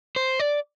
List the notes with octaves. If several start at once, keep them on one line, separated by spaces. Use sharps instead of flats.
C5
D5